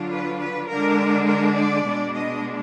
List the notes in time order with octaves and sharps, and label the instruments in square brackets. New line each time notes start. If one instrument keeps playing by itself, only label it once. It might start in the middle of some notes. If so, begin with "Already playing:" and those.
Already playing: [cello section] D3 F#3 D4 F4
B4
B4
D3 G#3 D4 A#4
A#4
D5
B2 G#3 D4
D#5